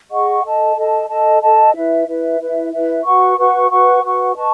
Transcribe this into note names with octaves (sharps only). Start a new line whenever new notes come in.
G#4 D#5 F#5 C#6
A4 D#5 A5
A4 D#5 A5
A4 D#5 A5
A4 D#5 A5
E4 B4 E5
E4 B4 E5
E4 B4 E5
E4 B4 E5
F#4 B4 F#5 C#6
F#4 B4 F#5 C#6
F#4 B4 F#5 C#6
F#4 B4 F#5 C#6
B4 D#5 A5 C#6